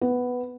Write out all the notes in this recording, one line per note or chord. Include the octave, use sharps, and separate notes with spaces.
B3